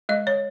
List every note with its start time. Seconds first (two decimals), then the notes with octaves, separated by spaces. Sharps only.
0.09 G#3 D#5
0.27 C#5